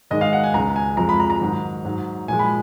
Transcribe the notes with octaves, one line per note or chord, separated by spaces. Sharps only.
G#2 D#3 G#3 D#5
F5
F#5
G#5
C#2 C#3 G#3 A#5
G#5
F2 F3 G#3 A#5
B5
A#5
A#5
G#2 D#3 F#3
G#2 F#3
A#2 F3 G#3 G#5
B5